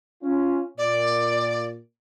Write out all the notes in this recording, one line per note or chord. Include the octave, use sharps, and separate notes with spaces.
C#4 F4
A#2 D5